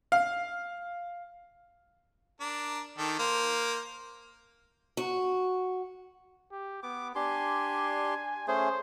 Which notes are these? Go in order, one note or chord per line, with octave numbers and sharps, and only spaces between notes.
F5
D4 A#4
D#3 A4 D6
A#3 C5
F#4
G4
B3 D6
D4 G4 G#5 C6
A3 C#4 G#4 C5